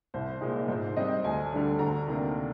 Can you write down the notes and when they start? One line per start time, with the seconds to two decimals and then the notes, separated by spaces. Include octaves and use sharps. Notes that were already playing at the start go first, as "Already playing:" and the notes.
0.14 C2 C5
0.41 A#2 G#3 D#4
0.68 G#2 C5
0.97 G3 C4 D#5
1.24 D2 G#5
1.52 D3 G3 D4
1.79 D2 A#5
2.08 C3 D#3 A#3 D4